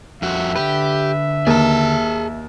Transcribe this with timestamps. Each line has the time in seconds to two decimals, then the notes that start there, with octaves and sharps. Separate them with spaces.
0.22 F2 F#4 E5
0.56 D3 G4 B4
1.47 D#2 G#4 A5